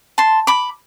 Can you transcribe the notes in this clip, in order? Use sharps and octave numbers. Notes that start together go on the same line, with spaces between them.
A5 C6
B5 D6